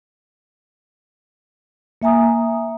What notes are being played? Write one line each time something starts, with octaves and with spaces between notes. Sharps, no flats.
A#3 E5 G#5 A#5 D#6